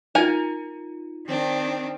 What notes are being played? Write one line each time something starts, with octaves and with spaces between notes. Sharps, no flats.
D#4 F4 A#4 G#5
D#3 C4 D4